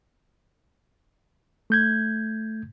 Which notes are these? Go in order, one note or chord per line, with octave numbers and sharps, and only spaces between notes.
A3 G6 G#6